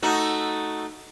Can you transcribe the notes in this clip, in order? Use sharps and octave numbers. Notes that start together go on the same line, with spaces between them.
A3 D#4 F#4